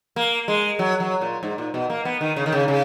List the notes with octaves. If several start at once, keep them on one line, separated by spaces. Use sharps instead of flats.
A#3
G#3
F#3
F#3
A#2
G#2
A#2
B2
A#3
B3
D#3
C#3
D#3
C#3
C#3